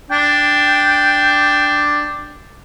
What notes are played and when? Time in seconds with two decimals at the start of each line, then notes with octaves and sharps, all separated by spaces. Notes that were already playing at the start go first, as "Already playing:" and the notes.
0.10 D4 G5